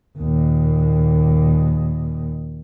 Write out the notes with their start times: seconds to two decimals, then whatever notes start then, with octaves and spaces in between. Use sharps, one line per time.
0.18 D#2 A#2